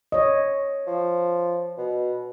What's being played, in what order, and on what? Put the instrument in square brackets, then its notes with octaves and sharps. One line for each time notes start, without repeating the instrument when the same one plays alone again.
[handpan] C#5 D#5
[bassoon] F3
B2